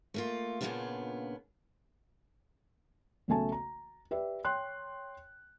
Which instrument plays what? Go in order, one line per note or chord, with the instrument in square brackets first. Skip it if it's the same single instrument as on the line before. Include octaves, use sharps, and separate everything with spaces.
[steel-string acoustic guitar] A3 A#3 F4
A#2 C#3 G#3 B3 D4 F4
[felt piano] B1 C#3 A3 G#5 A5
A#5
G4 B4 D5 E5
C#5 G5 C6 F#6